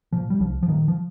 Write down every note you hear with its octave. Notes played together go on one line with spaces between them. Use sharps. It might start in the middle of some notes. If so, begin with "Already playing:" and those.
A#2 F3
G3
C2 F3
F3
A#2 D#3
F3